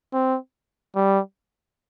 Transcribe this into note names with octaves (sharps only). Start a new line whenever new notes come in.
C4
G3